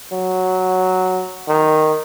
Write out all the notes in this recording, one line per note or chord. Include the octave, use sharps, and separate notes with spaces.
F#3
D#3